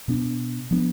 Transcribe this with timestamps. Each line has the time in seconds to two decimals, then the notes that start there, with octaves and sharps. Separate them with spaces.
0.08 B2 B3 D4
0.71 F3 B3 D4